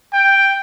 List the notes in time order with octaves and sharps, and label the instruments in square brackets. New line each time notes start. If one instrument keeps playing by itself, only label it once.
[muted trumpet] G5